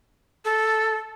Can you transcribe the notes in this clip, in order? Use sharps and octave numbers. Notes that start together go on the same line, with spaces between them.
A4